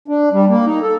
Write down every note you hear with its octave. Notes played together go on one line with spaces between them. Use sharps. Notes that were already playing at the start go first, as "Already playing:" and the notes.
D4
G3
A#3
D#4
A4